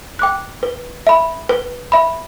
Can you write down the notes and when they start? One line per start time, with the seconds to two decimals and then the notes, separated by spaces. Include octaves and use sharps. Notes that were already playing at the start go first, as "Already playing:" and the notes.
0.19 G5 D6 F#6
0.63 B4
1.07 E5 B5
1.49 B4
1.92 E5 B5